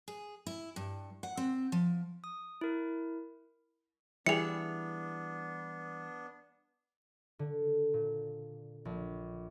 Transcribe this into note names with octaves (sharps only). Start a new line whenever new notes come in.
G#4
E4
G2
F#5
C4
F3
D#6
E4 A#4
E3 G3 B3 D4 E4 G#4 C#7 F7
D3
A#2
A#1